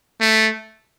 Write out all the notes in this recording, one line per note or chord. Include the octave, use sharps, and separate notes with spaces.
A3